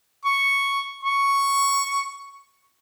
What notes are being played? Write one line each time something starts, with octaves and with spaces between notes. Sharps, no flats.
C#6
C#6